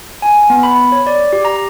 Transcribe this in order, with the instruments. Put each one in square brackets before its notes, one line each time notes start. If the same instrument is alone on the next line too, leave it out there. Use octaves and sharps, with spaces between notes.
[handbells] G#5
B3
B5
C#5
D5
G4
A#5